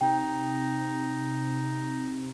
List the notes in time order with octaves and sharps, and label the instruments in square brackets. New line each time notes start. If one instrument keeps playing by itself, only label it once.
[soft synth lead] C3 [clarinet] D#4 [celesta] G5